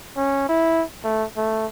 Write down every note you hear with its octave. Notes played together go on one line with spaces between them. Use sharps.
C#4
E4
A3
A3